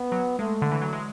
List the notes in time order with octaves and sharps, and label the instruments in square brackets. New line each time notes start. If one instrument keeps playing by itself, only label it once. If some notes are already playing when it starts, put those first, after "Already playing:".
Already playing: [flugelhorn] B3
[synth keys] F#3
[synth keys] G#3 [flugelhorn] A3
[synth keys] D3
E3
F#3
G#3